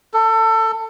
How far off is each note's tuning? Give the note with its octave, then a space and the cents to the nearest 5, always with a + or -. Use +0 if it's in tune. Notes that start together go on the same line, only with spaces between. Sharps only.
A4 +25